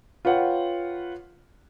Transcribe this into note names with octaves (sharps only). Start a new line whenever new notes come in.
F4 B4 C#5 F#5 G5